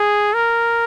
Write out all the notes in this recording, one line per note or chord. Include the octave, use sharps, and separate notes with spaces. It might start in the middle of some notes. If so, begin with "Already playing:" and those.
Already playing: G#4
A#4